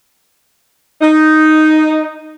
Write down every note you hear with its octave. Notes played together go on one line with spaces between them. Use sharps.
D#4